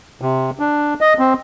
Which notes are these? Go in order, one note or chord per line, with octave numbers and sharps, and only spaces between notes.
C3
D4
D#5
C4